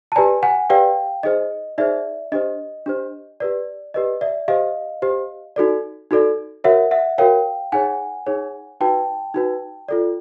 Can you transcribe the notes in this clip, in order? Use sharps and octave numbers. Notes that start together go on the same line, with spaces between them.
A5
G4 B4 D5 G#5 A#5
F#5 G#5
G4 B4 D5 F5 G5
D#4 G#4 C5 D#5
D#4 G#4 C5 D5 E5
D4 G4 C5 D#5
D4 G4 C5
G4 B4 D5
G4 B4 D5 D#5
D5 E5
G4 C5 D#5 F5
G4 C5
D#4 F#4 A4 D5
D#4 F#4 A4 D5
F#4 A#4 C#5 E5 F#5
E5 F#5
F#4 A#4 C#5 F5 G5
D#4 G#4 C#5 F#5 G#5
D#4 G#4 C#5
D#4 F#4 B4 G5 A5
D#4 F#4 B4
F4 A4 D5